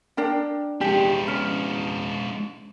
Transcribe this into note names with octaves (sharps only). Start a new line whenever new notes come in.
D4 A#4 G5
G#3 D4 G4
C#4